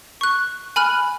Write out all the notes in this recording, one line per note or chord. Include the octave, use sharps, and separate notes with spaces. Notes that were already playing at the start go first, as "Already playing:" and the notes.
C#6 F#6
G#5 B5 F6 F#6